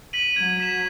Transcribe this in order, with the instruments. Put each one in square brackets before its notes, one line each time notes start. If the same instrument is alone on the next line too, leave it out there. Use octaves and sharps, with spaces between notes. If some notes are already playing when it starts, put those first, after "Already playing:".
[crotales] B6 D#7 F#7
[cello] F#3 [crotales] G#6
[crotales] B6 E7